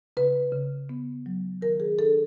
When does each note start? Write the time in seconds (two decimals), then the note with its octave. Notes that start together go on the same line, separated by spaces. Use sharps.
0.17 C#3 B4
0.52 C#3
0.89 B3
1.26 F#3
1.62 D#3 A#4
1.80 G#4
1.98 D4 A4